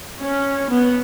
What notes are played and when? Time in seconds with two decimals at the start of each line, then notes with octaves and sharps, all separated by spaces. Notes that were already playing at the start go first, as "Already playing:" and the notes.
0.20 C#4
0.70 B3